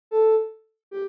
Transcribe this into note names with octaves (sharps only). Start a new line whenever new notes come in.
A4
G4